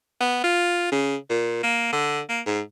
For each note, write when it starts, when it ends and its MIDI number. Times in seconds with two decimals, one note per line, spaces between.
0.20 0.42 59
0.44 0.91 65
0.92 1.16 49
1.30 1.63 46
1.63 1.90 58
1.93 2.20 50
2.29 2.41 58
2.46 2.61 44